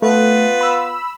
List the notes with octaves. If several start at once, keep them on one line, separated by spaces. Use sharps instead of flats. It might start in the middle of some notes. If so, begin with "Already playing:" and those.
A3 B3 F4 B4
B5 E6